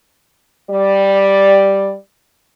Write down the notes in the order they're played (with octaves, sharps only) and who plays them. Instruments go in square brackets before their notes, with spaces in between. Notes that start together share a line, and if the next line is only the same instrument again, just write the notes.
[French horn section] G3 D5